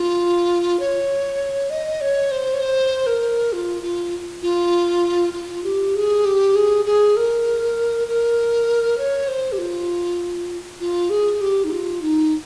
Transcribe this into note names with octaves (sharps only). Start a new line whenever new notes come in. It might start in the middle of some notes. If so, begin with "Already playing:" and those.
Already playing: F4
C#5
D#5
C#5
C5
C#5
C5
A#4
F4
F4
F4
F4
G4
G#4
G4
G#4
G#4
A#4
A#4
C#5
C5
G4
F4
F4
G#4
G4
D#4
F4
D#4